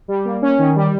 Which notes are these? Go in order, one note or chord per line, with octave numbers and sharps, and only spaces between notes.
G3
A#3
C#4
D#3
G3